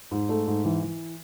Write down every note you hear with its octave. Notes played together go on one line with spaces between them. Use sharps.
G#2
A3
G#2
E3
E3